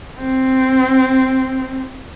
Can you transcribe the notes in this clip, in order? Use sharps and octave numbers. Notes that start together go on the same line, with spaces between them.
C4